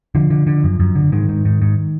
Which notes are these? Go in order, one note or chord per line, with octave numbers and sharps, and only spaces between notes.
D3 F3
D3
D3
F#2
F#2
D3
G#2 D#3
G#2
G#2
G#2